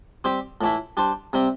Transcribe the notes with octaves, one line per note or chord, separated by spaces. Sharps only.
G3 C4 G4 C5
A2 E3 A3 E4
G3 D4 C5
C3 G3 C4